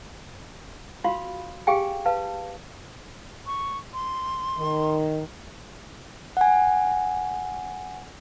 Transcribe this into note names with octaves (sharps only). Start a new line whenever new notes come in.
F4 F#4 F5 B5 C6
G4 G#4 F5 G5 G#5
B4 F5 A5
C#6
C6
D#3
F#5 G#5